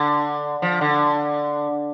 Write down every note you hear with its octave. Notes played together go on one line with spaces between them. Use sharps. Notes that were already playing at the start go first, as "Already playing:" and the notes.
Already playing: D3
F3
D3